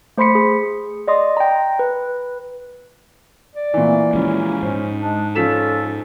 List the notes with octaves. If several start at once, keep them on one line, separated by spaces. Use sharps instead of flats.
A3 C5 B5 C6 B6 C#7
G#4
D5 D#5 C6 D#6
G5 A#5
B4
D5
A#2 E3 A3
F3 G#3 C#4 E4
G#2 C5
G#3 D4
F3 C#4 A4 B6 E7